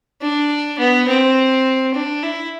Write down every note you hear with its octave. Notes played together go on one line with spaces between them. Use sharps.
D4
B3
C4
D4
E4